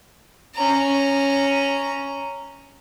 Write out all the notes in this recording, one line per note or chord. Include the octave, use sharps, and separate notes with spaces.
C#4 A#5